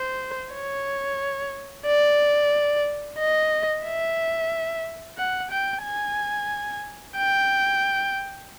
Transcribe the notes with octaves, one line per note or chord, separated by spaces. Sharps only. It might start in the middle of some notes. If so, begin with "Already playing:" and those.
Already playing: C5
C#5
D5
D#5
E5
F#5
G5
G#5
G5